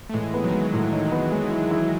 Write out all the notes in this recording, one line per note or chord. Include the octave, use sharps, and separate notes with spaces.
A3
A2 E3 G#3
B3
D#3 F#3
G#3
A2
D#4
B3
G#3
E4
E4